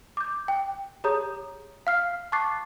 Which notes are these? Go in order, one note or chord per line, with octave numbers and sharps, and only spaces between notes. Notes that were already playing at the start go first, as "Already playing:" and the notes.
D6 G6
G5
G4 G#4 C#5 A#5 D#6 G6
F5 F6 C7
A5 C#6 D6 F#6 A6 C7